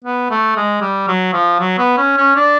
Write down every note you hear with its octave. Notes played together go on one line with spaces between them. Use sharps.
B3
A3
G#3
G3
F#3
F3
F#3
B3
C#4
C#4
D4